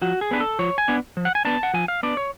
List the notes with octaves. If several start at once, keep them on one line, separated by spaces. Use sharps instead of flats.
F3 F#4
G#4
B3 D4 B4
A4
F3 C#5
G#5
B3 D4
F3
F#5
G#5
B3 D4 A5
F#5
F3 G#5
F5
B3 D4 D5
C#5